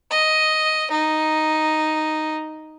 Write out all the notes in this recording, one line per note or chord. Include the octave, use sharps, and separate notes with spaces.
D#5
D#4